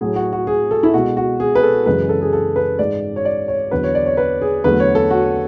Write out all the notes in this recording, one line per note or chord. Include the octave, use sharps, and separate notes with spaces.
A2 F#3 A3 G#4
F#4
F#4
G#4
A4
E4
B2 G#3 F#4
F#4
G#4
B4
A4
F#2 C#3 E3 G#3 B4
A4
G#4
A4
B4
G#2 G#3 D5
C#5
D5
C#5
E2 D3 F#3 B4
C#5
D5
C#5
B4
G#4
E2 D3 F#3 A3 B4
C#5
A4
F#4